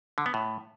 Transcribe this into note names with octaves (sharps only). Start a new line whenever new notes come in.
D3
B3
A2